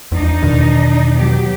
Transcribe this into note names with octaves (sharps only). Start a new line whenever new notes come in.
E2 D4 D#4
E2 B2 D#3
F#3 B3 G4